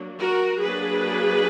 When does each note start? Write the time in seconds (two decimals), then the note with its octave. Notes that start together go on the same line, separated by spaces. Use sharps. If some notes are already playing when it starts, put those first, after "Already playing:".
Already playing: F#3 A#3 D4
0.19 F#4 A#4
0.60 F#3 A#3 D4 G#4 B4